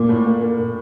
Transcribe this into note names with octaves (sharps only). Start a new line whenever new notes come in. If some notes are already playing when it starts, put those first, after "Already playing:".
Already playing: A#2 A#3
A2 A3
A#2 A#3
A#2 A#3
A#2 A#3